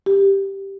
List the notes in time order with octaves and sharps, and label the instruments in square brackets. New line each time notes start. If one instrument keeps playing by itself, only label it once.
[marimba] G4